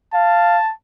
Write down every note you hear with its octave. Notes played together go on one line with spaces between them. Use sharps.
F5 A5